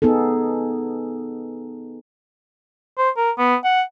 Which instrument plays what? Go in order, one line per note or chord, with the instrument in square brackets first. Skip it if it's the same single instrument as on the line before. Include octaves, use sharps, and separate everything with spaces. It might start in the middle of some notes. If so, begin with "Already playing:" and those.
[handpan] B3 D#4 G#4 A4
[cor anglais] C5
A#4
B3
F#5